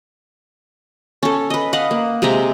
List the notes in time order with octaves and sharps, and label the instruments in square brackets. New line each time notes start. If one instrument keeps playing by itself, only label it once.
[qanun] C#4 A4
B4 D#5
B4 D#5 F5 F#5
A#3
C3 G#3 E5 A#5